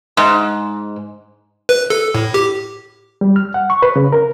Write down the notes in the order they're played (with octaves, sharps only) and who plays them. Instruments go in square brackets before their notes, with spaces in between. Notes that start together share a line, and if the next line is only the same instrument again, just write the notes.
[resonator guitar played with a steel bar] G#2
[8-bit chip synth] B4
A4
A2
G4
[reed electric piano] G3
F6
F#5
C#6
B4
C#3
A#4